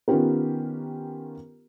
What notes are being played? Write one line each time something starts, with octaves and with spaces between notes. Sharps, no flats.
D#3 B3 C#4 F4 G4 A#4